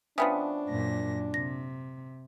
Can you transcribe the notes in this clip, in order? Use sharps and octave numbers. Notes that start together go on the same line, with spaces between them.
F3 B3 C#4 D4 E5 G5 D#6
F#2 A#2 A#6
C3 A#6